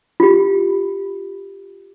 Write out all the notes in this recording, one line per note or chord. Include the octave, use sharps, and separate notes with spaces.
F4 G4